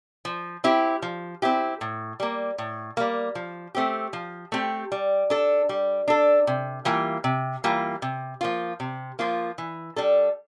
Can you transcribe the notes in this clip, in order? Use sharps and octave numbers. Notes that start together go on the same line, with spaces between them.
F3
C4 E4 G4
F3
C4 E4 G4
A2
G3 A#3
A2
G3 A#3
F3
A3 C4 G4
F3
A3 C4 G4
G3
D4 A4
G3
D4 A4
C3
E3 G3 A#3 F4
C3
E3 G3 A#3 F4
C3
F3 A#3 F4
C3
F3 A#3 F4
E3
G3 D4 A4